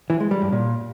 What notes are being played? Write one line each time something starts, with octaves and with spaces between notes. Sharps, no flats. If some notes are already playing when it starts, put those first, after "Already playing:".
E3
G#3
G3
G2
A#2